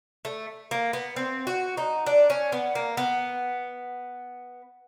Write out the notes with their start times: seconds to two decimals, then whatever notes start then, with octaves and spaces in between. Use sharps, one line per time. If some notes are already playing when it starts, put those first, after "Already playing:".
0.25 A3
0.71 A#3
0.93 B3
1.16 C4
1.47 F#4
1.77 D#4
2.06 D4
2.30 C#4
2.52 B3
2.75 A#3
2.97 B3